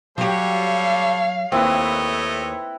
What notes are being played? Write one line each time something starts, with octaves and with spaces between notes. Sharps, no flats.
F#3 G3 G4 A4 C#5 F5
D#2 A3 C4 E4 B4 C#5 D#5